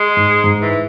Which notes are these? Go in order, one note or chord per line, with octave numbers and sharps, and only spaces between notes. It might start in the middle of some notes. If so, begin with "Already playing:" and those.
Already playing: G#3
G#2
G#2
E3